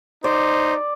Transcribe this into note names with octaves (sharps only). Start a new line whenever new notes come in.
D#4 C5 D5